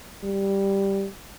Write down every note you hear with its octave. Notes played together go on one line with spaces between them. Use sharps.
G3